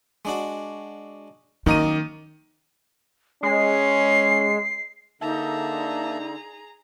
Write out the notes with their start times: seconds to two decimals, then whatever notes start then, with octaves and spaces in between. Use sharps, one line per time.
0.25 G#3 D4 F#4
1.66 F#2 D#3 A#3 D#4 D#5 A#5 D#7
3.43 G#3 C#4 C7
5.22 D3 A#3 D#4 G#4 E5 A5 A#5